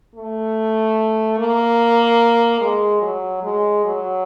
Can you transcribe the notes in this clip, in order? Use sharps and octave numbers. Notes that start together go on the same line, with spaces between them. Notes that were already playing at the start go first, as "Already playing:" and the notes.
A3
A#3
G#3
F#3
G#3
F#3